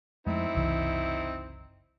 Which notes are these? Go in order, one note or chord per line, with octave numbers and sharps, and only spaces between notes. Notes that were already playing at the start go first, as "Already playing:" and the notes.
F2 G#3 A3 C4 D#4 E4
F#1 C2 E3